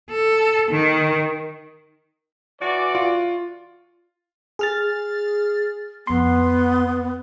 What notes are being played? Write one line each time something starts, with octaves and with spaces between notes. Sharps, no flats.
A4
D#3
E3 F#4 D5
F4
G#4 F6 A6
F2 B3 C6